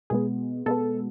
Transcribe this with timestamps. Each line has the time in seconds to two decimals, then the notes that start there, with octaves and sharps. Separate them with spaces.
0.10 B2 G#3 B3 G#4
0.66 B2 G#3 B3 A4